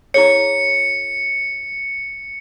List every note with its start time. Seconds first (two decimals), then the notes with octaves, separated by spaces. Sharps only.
0.14 E4 G#4 C#5 C#7